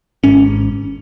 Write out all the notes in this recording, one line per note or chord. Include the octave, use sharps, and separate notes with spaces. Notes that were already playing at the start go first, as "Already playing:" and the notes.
G#1 G#2 C#4